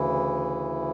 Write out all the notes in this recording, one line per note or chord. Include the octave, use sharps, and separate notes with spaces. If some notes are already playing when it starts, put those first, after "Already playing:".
Already playing: D2 C#3 E3 E4